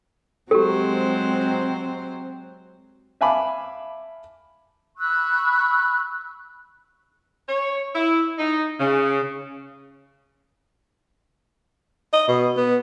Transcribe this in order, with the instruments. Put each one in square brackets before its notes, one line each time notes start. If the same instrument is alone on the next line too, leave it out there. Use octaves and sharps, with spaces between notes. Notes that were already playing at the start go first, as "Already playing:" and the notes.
[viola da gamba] F#3 G#3 C5 [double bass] C4 [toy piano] G4 A4
[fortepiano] E5 F5 G#5 A5 B5 D6
[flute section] B5 C#6 E6 F#6
[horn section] C#5
E4
D#4
C#3
[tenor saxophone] D#5
B2
B3